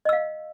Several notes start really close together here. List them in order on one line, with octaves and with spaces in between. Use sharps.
D#5 E6 F5